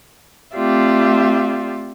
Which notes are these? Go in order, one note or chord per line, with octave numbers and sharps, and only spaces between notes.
A3 C4 F4 G4 D5 E5